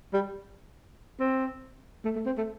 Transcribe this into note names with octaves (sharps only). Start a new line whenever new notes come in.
G3
C4
A3
A3
C4
A3